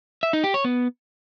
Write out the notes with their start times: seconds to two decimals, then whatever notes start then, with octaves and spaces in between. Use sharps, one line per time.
0.23 E5
0.33 D#4
0.44 G4
0.54 C#5
0.64 B3